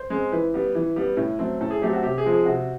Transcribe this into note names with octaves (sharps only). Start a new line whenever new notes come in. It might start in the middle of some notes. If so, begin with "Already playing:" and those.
Already playing: C5
G#3 C4
E3 B4
G3 B3
E3
G3 B3
A2
F#3 A3 C4
A2 A4
G#4
F#3 A3 C4 G4
F#4
C3 G4
G#4
F3 G#3 C4
G#4
C3 F#4